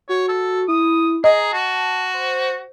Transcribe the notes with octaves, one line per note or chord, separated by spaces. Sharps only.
F#4 C#5
A4
E4 D#6
G#4 D#5 A#5
F#4 A5
C5